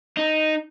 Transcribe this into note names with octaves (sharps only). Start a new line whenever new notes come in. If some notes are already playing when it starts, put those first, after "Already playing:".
D#4